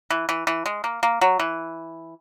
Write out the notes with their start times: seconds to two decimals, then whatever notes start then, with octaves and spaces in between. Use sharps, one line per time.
0.10 E3
0.29 E3
0.47 E3
0.66 G#3
0.84 A#3
1.03 A#3
1.21 F#3
1.40 E3